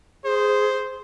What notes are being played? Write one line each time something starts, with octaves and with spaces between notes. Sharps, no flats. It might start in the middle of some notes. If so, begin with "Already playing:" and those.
G#4 C5